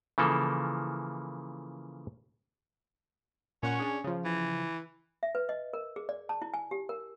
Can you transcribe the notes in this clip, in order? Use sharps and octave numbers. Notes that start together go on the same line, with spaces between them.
C#3 E3 F3 A#3 A4
A#2 C#4 F#5 C#6
D4 G#4
C#3 F3
E3
E5
B4
D#5
A#4
G#4
D5
A5
E4
G#5
G4
A#4